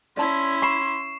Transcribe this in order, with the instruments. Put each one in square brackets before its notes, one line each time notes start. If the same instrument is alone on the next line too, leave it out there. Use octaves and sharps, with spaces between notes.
[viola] C#4 E4 [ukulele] D5 A5 [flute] C6
[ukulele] B5 [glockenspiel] C#6 C7 E7